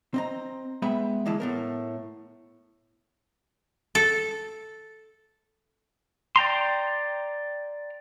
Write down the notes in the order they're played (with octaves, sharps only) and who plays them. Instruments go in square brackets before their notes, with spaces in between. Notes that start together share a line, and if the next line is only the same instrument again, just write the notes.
[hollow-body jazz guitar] C4 D#5 A#5
G#3 B3 E5 G5 B5
D2 E3 G#3 E4 A5
A2 B3 A#4
[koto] A4
[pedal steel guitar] D5 G5 A#5 C6